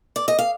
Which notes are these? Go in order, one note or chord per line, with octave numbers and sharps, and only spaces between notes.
D5
D#5
F5